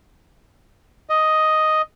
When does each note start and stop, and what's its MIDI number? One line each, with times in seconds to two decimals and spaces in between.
1.09 1.82 75